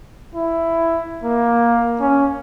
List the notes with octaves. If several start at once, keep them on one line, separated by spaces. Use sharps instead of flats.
E4
A#3
C#4